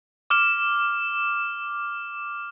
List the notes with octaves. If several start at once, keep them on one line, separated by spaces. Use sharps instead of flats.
D6 F6 E7